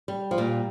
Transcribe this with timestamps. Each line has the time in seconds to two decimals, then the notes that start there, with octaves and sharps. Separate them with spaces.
0.08 G3
0.31 F3
0.38 A#2 G3